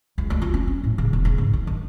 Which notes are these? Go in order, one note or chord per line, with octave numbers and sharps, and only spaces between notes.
C#2
D2
F4
C#4
C#4
A2
C#3
E1
C#3
G#2
E4
D#3